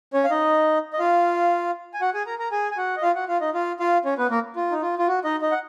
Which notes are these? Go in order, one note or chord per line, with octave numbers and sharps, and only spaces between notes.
C#4 C#5
F5
D#4 D#5
D#5
F4 F5
G#5
F#4 F#5
G#4 G#5
A#4 A#5
A#4 A#5
G#4 G#5
G#5
F#4 F#5
D#5
F4 F5
F#4 F#5
F4 F5
D#4 D#5
F4 F5
F4 F5
C#4 C#5
B3 B4
A#3 A#4
F4
D#4
F4
F4
F#4
D#4 D#5
D#4 D#5
F#5